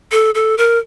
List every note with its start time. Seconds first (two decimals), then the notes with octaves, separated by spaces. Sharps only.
0.12 A4
0.35 A4
0.58 A#4